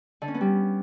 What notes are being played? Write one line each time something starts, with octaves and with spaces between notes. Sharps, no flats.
D3
C#4
B3
G3